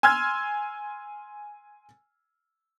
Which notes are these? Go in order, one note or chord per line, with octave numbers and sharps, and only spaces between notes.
G#5 C6 E6 F6 G#6